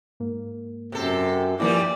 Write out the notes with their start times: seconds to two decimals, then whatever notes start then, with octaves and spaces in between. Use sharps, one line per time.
0.20 G#2 A#3
0.92 F#2 C3 A4
1.60 G2 E3 F3 G3 A#3 E4 D5